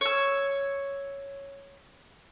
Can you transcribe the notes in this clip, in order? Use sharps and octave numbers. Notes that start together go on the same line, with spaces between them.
C#5 E6